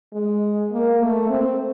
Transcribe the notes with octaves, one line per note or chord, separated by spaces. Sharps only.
G#3
A#3
A3
C4